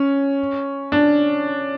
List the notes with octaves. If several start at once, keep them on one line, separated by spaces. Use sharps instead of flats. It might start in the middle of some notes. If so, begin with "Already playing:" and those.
Already playing: C#4
D4